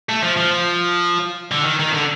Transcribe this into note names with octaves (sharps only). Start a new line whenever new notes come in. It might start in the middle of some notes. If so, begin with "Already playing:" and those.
A3
F3
F3
D3
D#3
D#3
D3